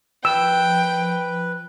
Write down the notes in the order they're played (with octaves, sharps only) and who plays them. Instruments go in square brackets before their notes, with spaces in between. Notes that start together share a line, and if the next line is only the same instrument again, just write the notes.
[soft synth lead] F3 [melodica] B4 [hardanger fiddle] G5 [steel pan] E6